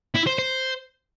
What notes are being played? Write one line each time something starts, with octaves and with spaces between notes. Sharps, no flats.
E4
C5
C5